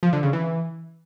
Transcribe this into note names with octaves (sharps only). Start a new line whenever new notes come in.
F3
D3
C#3
E3